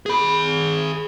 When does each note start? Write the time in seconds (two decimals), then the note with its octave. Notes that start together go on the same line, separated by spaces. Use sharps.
0.06 G#4 B5